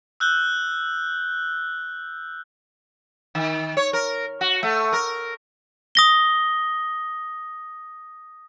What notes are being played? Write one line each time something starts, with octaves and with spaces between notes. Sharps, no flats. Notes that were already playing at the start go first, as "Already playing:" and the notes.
E6 F#6 G6 G7
D#3
C#5
A#4
F#4
A3
A#4
D#6 A#6 G7